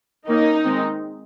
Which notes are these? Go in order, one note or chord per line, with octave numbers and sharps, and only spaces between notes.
D#3 A#3 C#4 D#4
D#3 G#3 C4